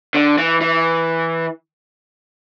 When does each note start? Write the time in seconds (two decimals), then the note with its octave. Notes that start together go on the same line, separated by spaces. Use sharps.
0.14 D3
0.38 E3
0.61 E3